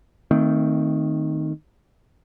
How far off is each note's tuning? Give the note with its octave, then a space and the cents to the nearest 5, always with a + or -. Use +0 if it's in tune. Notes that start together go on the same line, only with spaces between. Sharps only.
D#3 +0 A3 +25 C4 +0